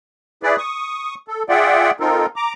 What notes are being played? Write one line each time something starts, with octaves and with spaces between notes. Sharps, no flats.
E4 G#4 B4 D5
C#6 D#6
A4
F4 G#4 D5 E5 F#5 G5
C4 D#4 F4 A4 A#4
A#5 D6